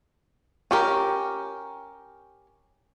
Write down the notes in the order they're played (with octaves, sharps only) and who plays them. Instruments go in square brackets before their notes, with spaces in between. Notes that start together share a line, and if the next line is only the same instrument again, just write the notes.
[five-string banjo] C#4 G4 A#4